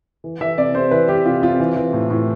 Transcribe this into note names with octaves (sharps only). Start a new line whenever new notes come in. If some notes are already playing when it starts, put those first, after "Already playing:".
E3
E3 E5
C3 D5
C3 C5
E3 B4
E3 G4
C3 F4
C3 F4
E3
E3
A2
A2